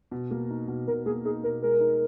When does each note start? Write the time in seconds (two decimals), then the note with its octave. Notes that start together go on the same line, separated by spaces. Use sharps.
0.11 B2
0.31 A#3
0.50 D#4
0.68 B2
0.87 B2 A#4
1.06 A#3 G#4
1.25 D#4 G#4
1.43 B2 A#4
1.62 G#3 A#4
1.80 D#4